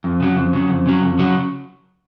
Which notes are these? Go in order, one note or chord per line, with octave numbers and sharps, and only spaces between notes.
F2
C#3 F#3
F2
C#3 F#3
F2
C#3 F#3
F2
C#3 F#3